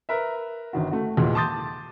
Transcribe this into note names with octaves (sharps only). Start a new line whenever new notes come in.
A#4 B4 E5
G1 D#3 F#4
A3 F#4
D#2 A#2 E3 F#3 G#3
A5 C6 D6 D#6 G6 A6